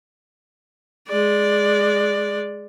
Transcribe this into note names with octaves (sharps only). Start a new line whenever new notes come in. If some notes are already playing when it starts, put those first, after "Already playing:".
G#3 D5